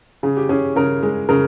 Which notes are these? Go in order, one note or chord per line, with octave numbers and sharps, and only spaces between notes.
C#3 G#4
G4
C#4 G#4
C#3 A#4
G#3
C#3 A#4